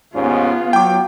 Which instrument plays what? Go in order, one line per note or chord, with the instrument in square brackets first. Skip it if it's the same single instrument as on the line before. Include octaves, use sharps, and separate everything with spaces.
[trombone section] D#2 G#2 C#4 [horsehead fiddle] B3 F4
[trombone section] F#3 [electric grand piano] G5 D6